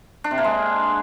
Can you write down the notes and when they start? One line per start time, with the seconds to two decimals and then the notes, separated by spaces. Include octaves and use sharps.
0.24 D4
0.31 C3
0.38 A#3
0.44 G#3